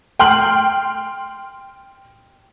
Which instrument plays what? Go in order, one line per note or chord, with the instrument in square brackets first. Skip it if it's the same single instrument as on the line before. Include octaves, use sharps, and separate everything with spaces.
[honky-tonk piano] G5 C6 F6 F#7